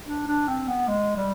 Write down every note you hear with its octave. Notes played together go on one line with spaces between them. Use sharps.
D4
D4
C4
B3
G#3
G3